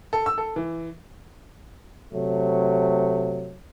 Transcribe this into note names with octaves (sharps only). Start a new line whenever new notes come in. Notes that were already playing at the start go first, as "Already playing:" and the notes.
A4
E6
A4
E3
C3 F#3 A3